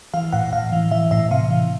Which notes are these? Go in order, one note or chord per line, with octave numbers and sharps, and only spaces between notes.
E3 F5
A2 F#5
A2 F5
E3
E3 E5
A2 E5
C3 F5
E3